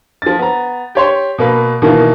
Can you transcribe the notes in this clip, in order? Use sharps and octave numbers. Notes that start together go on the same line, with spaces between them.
F3 A6
B3 A#5
G4 C#5 C6
B2 A#3 B4
B2 D#3 E3 A#3